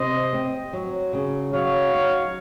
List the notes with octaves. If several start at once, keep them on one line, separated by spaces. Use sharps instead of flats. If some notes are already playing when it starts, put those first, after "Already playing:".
Already playing: C3 C5 D#5
C4
F#3
C#3
F#3 C#5 F5
D#4